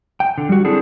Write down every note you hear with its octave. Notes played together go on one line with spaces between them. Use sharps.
G5
D3
G3 F#4
C4 D4 E4 G#4 A4